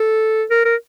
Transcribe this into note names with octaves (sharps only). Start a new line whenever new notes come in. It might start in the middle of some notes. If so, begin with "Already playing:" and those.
Already playing: A4
A#4
A#4